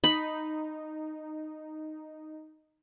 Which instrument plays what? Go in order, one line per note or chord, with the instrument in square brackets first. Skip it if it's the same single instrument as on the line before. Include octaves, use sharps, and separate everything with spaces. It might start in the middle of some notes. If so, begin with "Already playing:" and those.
[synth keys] D#4 [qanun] B5